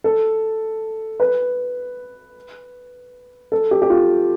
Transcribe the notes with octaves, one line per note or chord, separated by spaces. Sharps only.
A4
B4
A4
G4
G4
F4